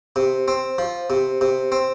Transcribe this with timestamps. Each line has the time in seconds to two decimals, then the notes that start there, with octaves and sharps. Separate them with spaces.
0.16 C3
0.48 C4
0.78 F3
1.10 C3
1.41 C3
1.72 C4